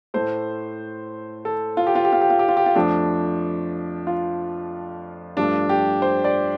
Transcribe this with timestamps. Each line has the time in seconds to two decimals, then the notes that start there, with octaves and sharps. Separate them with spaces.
0.14 A2 A3 C5
1.45 A4
1.77 F4
1.87 G4
1.95 F4
2.05 G4
2.13 F4
2.21 G4
2.30 F4
2.39 G4
2.49 F4
2.57 G4
2.66 F4
2.75 F2 F3 A3 D4
4.07 F4
5.37 G2 F3 A3 D4
5.69 G4
6.02 C5
6.24 D5